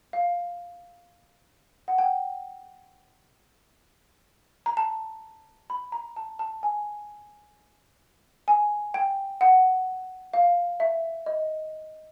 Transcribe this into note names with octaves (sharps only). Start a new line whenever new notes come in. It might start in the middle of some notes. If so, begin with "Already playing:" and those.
F5
F#5
G5
A#5
A5
B5
A#5
A5
A5
G#5
G#5
G5
F#5
F5
E5
D#5